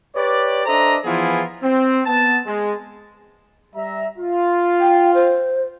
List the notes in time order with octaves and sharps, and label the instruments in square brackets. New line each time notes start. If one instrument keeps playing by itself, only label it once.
[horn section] G4 B4 C#5 D5
D4 A4 C5 D#5 E5 A#5
E3 F3 B3 E4 F4 G#4
C4
B3 A5
G#3
[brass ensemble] G3 E5 A#5
F4
[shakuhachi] G5
C5